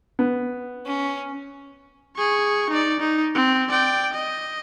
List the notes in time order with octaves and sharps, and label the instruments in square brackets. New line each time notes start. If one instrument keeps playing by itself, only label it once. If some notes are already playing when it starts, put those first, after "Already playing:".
[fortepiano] B3
[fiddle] C#4
[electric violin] G#4 C#6
D#4 D5
D#4
C4
D5 G5
D#5